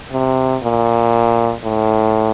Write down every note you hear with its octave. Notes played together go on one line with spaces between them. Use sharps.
C3
A#2
A2